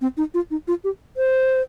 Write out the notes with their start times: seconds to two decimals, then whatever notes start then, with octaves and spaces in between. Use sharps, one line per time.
0.01 C4
0.17 D#4
0.34 F4
0.51 D#4
0.68 F4
0.84 G4
1.17 C5